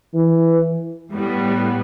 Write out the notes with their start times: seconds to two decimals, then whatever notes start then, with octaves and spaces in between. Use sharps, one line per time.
0.14 E3
1.11 A2 G3 B3